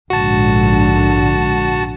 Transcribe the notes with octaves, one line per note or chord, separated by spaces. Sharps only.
A#1 G#2 D3 F#4 A5